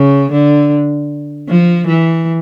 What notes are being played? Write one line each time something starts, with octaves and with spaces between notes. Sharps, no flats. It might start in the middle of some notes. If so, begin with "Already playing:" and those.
Already playing: C#3
D3
F3
E3